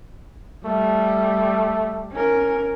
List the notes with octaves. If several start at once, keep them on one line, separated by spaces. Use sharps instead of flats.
G3 A3
C#4 A#4